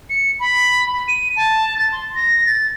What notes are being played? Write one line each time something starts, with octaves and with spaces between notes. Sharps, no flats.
C#7
B5
D#7
A5
A6
C6
A#6
A6